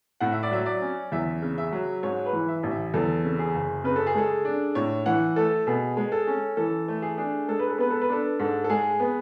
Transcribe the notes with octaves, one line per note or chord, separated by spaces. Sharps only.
A2 F#5
E5
D5
F#3 E5
D5
C#4
E2 E5
C#3
E5
F#3
G#2 C#5
B4
E3
E5
A1
E5
E2 A4
C#3
G#4
F#1
C#3 B4
A4
G#4
G#3 A4
D4
A2 C#5
E3 F#5
A3 A4
B2 G#4
G#3
A4
C#4
E3 A4
A3
G#4
D4 G#4
G#3 A4
B4
A4
B3 B4
A4
B4
D4 A4
G#2 A4
A4
G#3 G#4
B3